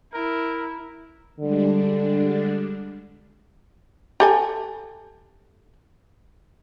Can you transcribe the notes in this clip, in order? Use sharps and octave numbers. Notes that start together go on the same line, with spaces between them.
E4 A#4
D3 G3 G#3 D4
G4 A4 G#5